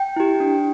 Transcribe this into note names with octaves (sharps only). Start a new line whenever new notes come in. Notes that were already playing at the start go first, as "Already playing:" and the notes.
Already playing: G5
E4 G4
D4